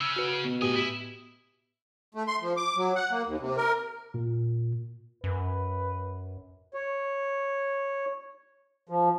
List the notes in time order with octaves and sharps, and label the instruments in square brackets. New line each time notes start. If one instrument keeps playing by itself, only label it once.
[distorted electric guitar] C#3 C#4 [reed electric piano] E6
[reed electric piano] F#4 B4
[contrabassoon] B2
[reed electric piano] A2 G4 D#6 [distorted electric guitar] C3 G#5
[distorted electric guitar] E4 E5
[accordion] A3
C6
F3
D6
F#3
F#5
A#3
D#2
C3
A#4
[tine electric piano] A#2
[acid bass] F#2 [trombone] B4
[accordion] C#5
F3